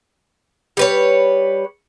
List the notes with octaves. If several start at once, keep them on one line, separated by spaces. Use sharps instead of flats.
G3 B4 C#5